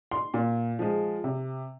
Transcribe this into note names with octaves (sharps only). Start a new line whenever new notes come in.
C6
A#2
F3 G#3
C3